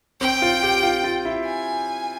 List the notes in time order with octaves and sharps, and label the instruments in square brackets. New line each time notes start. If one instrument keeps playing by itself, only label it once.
[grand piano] C4 [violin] G5
[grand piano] F4
G4
F4
F4
E4
[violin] G#5